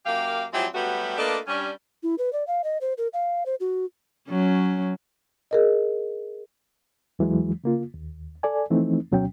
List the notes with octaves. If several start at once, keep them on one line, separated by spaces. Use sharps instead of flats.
F#2 A#3 G4 F5
F3 F#3 G#3 C4 E4 G4
F#3 G3 A3 B3 F#4 G4
A3 A#3 D4 F4 B4 D#5
G3 C#4 D4
E4
B4
D5
F5
D#5
C5
A#4
F5
C5
F#4
F#3 C#4
G#4 A#4 D#5
E2 E3 F#3 G#3
C#3 A#3 F4
D#2
A4 D5 G#5
E3 F3 A3 C4 D#4
D2 B2 F#3 C#4 G5